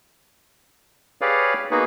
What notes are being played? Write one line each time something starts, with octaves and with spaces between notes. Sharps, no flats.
G4 G#4 B4 C#5 D5 F5
A#3 B3 D#4 F#4 G#4 B4